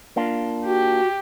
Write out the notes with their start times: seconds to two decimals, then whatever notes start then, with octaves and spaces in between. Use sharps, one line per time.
0.16 A#3 D4 F4
0.65 F#4 G4